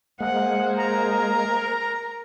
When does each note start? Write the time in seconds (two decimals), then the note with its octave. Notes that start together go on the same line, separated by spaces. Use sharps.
0.20 G#3 A#3 G#4 C5 F#5
0.78 A#4 A#5